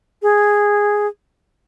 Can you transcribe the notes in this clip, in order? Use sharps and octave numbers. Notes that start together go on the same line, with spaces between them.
G#4